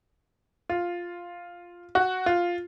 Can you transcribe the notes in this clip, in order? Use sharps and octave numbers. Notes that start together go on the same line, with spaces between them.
F4
F#4
F4